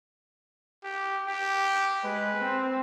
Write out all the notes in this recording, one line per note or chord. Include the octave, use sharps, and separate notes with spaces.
G4
G4
G#3 B4
C4